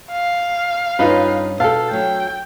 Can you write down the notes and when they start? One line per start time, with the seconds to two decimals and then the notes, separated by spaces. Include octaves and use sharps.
0.12 F5
0.99 G2 C#4 D#4 F4 B4
1.60 B2 A4 F5 G5 A5
1.91 F#3 A3 G5